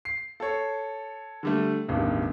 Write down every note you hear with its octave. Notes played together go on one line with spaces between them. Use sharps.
C7
A4 C#5
D3 G3 A3
E1 A1 G2 D#3